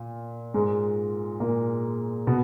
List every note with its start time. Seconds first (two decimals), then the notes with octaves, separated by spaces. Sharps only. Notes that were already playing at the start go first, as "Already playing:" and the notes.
Already playing: A#2
0.54 G#2 G#3
1.40 A#2 A#3
2.27 B2 B3